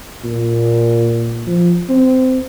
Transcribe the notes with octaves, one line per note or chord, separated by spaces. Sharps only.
A#2
F3
C4